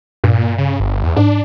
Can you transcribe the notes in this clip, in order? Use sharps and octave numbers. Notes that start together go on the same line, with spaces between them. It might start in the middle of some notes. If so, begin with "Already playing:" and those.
G2 A#2
C#3
G1
E2
G#2 D4